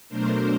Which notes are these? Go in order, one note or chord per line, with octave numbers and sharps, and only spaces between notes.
B2 F#3 A3 D4 A#4 C5